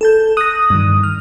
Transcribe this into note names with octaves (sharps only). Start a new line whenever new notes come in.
A4 A5 G6
D#6 F#6 A#6
G2 D#3
F6